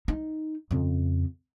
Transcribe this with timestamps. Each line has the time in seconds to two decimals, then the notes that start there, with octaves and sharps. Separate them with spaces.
0.08 D#4
0.71 F2 C#3